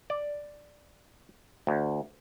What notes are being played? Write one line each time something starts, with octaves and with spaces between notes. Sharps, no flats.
D5
D2